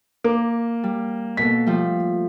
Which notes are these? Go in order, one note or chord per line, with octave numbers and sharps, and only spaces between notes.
A#3 D6
G3
B2 A#3 A4 B6
F3 G3 A3